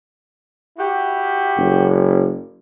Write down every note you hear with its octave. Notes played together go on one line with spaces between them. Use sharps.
E4 F#4 G4
F#1